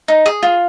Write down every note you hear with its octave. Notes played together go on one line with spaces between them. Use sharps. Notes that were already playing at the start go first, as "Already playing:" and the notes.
D#4
G#4 D#6
F4